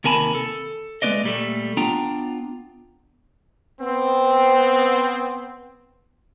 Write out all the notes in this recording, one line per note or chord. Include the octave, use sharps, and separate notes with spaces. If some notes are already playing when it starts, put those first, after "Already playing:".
D#2 C3 A#4 G#5 A5 B5
A4
G#3 A3 C4 B4 D5 D#5
A#2 G3 A3
B3 D4 F4 G5 A#5
B3 C4